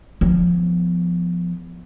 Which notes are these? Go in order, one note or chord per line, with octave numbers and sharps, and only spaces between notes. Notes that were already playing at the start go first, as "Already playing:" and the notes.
F3 B3